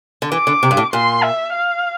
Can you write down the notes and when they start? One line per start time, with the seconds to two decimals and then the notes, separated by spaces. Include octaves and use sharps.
0.22 D3
0.32 E3 D6
0.47 D3
0.63 C3
0.71 G2
0.77 A2
0.93 A#2 C6
1.23 E5
1.52 F5